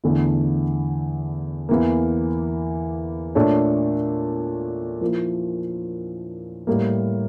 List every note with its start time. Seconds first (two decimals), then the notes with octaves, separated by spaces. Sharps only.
0.04 E2 D3 A3 E4
1.69 E2 E3 A#3
3.35 A#2 A3 D4 A4 C#5
5.01 F3 A#3 E4
6.67 A2 G3 A#3